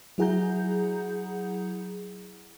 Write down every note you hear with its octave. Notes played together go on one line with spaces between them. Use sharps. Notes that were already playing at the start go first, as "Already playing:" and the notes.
F#3 E4 G#4 F#5 A#5 G6